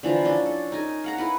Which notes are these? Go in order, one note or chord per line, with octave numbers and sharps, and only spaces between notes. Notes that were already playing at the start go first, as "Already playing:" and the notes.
D3 E3 F3 A#5
C#4 D4
A4
D#4 A#4 G#5
F5 F#5 A#5
E4 A#4 B4 A#5